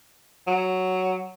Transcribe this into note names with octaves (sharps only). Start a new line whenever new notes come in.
F#3